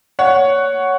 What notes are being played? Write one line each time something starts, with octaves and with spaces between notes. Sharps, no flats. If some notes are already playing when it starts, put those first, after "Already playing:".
C#5 F#5